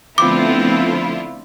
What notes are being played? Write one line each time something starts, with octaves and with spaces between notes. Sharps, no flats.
D3 F3 A3 B3 C4 E4 F4 D6